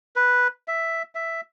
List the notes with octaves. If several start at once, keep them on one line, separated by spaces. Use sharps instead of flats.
B4
E5
E5